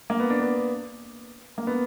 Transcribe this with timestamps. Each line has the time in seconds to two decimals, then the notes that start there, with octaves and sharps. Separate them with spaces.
0.10 A#3
0.20 B3
0.30 D4
0.39 B3
1.58 A#3
1.67 B3